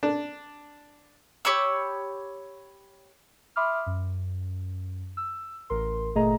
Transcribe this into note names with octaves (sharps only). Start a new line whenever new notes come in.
D4
G4 C#5 B5 E6
E5 B5 C6 D6 D#6 F6
F#2
E6
A1 A#4 C6
G1 A#2 A3 G#4 D#5 A#5